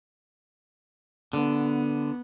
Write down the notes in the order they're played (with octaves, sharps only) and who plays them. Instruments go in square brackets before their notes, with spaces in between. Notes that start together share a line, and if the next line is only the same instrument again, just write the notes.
[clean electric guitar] D3 [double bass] B3